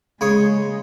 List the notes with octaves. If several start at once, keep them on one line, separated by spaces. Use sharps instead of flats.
C#3 G#3 G#4 C#5